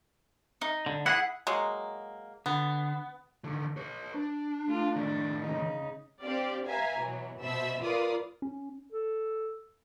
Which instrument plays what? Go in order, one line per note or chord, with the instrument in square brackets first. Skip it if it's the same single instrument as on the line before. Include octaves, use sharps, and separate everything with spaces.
[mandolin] D#4
[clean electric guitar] D3
[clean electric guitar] E4 F#4 G#4 [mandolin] F#5
[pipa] F#3 G#3 A#3
[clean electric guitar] D3 [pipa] B3
[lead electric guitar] D3 D#3
B4 C#5
D4
[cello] A3 F4
[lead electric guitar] A2 D#3 [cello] D4
[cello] C#3 D#4
[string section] C4 D4 G4 D5 F5
B4 E5 F5 G#5 A#5
B2 E3 F#3
B2 C5 E5 A5 B5 E6
F4 A#4 B4 D5 F5 D#6
[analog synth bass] C#4
[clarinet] A4